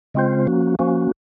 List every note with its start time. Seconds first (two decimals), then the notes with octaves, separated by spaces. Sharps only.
0.14 C#3 G#3 C4 F4 C5
0.47 F3 A#3 C#4 F#4
0.79 F3 A#3 C#4 F#4